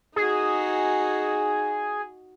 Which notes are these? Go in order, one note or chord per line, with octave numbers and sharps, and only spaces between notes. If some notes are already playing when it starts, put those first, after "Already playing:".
D#4 F#4 G#4